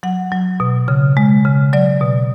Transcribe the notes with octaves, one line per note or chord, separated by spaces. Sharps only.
F#3 F#5
F#3
B2
C#3
G#3
C#3
F#3 D5
B2